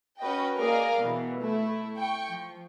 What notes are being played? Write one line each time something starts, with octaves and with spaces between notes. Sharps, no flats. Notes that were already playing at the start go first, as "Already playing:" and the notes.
C#4 F#4 B4 D#5 G5
A#3 G#4 A#4 D5 D#5 F5
B2 E3
A3 E4
G5 C#6
F3